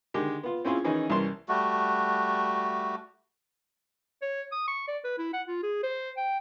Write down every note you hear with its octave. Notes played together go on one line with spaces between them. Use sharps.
D3 D#3 G#3 G4
B3 F4
C4 C#4 E4 F4 G#4
D#3 E3 C#4 D#4 E4 G#4
C2 E3 C#4 A#4 A5 C6
G3 A3 F#4
C#5
D#6
C#6
D5
B4
E4
F#5
F4
G#4
C5
G5